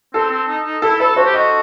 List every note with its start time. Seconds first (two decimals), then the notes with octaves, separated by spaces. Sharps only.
0.14 C4 A4
0.31 C4
0.48 D#4
0.65 D#4
0.82 E4 A4
1.00 A4 B4
1.16 F#4 C5
1.26 G4
1.33 F#4 D#5